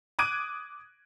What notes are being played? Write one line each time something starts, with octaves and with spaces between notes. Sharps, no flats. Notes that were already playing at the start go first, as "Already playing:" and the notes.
D6 D#6 F#6 G#6 D7 D#7